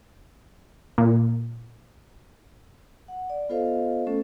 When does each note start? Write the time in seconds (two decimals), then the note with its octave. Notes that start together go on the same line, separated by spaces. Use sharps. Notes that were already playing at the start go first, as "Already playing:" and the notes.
0.98 A#2
3.08 F#5
3.30 D5
3.49 B3 F4 A4 C5 D#5 F5
4.07 A3 C#4 A4